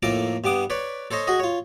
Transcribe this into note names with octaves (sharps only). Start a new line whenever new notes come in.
F2 A2 A#3 A4 A#4 D6
G2 G3 B3 D6 D#6
B4 C#5 D5
A4 C5 C#5 D#5
F#4 G#4 D#5
F4 C#5